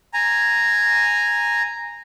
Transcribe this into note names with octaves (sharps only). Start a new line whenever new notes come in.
G#5 A#5